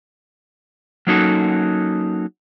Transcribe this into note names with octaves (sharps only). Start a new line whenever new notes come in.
F#3 A#3 C#4 D#4 F#4 A4